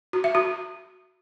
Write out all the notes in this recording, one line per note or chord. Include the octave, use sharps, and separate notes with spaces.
F#4
E5
F#4